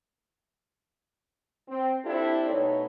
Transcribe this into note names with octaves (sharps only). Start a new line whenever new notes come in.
C4
C4 D4 E4 G4 A4
B2 A3 D#4 C#5